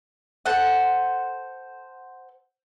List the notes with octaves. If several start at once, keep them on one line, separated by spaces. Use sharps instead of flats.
A4 C5 F#5